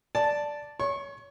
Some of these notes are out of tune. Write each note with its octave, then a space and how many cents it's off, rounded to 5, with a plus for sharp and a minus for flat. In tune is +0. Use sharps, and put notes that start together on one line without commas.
D5 +0 A5 +0
C#5 +25 C#6 -30